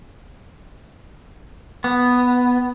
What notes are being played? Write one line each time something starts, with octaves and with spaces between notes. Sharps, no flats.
B3